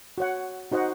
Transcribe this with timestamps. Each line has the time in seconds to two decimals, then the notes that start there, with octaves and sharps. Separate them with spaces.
0.18 F#4 C#5 F#5
0.72 D#4 F#4 C5 D#5 F#5